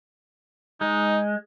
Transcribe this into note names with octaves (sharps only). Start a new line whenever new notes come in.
G#3 D#4